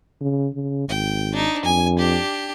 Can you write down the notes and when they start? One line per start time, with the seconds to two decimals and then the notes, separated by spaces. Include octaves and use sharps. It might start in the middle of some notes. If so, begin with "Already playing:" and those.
0.21 C#3
0.54 C#3
0.89 G#1 G5
1.33 D4 D#4
1.65 F2 G#5
1.98 D4 G4